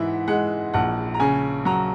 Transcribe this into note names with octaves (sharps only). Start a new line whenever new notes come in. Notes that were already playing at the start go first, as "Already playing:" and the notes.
Already playing: G#2 E3 E5 F#5
G#3 F#5
A#1 F#5
A#5
C#3 G#5
F#3 A#5